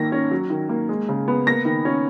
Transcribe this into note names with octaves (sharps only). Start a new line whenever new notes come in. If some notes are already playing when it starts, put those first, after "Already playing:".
Already playing: D#3 A#3 A#6
C#4
F#3
D#3
A#3
G#3
C#3
B3
A#3 A#6
D#3
C#4